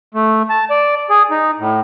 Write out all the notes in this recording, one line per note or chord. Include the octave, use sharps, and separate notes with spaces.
A3
A5
D5
G#4
D#4
A2